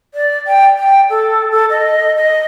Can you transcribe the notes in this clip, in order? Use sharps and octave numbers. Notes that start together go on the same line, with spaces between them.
D5
G5
G5
A4
A4
D#5
D#5